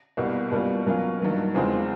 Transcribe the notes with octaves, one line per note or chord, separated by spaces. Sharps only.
C2 B2 G3 A#3
B2 G3 A#3 C#4 F4
B2 F#3 A#3 C#4 F4
G2 D#3 F#3 A#3
E2 C#3 F3 G#3 C4